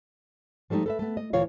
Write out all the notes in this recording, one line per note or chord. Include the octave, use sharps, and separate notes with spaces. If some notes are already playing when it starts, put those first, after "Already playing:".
F3 G3 A3 D4 D#4
A4 B4 E5
A3 B3
D#5
D2 A#2 E3 F4 C#5 F5